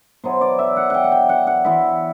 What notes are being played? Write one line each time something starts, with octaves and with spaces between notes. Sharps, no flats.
B2 F#3 B3 E4 C5
D5
E5
F#5
F#5 G5
F#5
G5
F#5
F#5
E3 B3 E4 E5